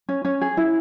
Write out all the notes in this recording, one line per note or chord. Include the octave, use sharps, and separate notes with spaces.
C#4
C#4
G#4
E4